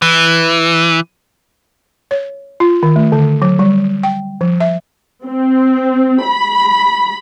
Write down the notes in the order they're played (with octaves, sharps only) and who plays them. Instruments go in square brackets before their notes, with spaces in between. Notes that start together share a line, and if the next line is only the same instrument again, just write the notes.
[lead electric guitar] E3
[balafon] C#5
F4
D#3
A3
D3
F#3
G3
G5
F3
E5
[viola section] C4
B5